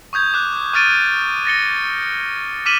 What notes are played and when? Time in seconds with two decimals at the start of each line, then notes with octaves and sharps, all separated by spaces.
0.13 C#6 D#6 G6 G#6
0.34 D6 F#6
0.74 C#6 D#6 F6 A6 D7 D#7
1.45 A6 A#6 C#7 G7
2.66 D6 F6 B6 D#7 E7 F#7